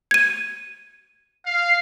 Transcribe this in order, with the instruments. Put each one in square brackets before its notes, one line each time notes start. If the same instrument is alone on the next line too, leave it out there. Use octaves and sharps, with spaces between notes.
[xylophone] G#6 D#7
[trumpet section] F5